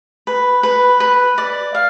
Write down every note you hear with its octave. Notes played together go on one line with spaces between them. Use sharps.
B4
B4
B4
D5
F5